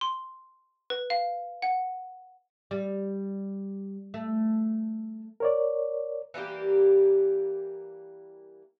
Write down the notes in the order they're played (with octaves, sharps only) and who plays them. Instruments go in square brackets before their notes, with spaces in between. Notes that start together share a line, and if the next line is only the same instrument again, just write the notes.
[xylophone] C6
B4
F5
F#5
[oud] G3
A3
[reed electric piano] A#4 C#5 D5
[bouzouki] E3 G3 A#3 G4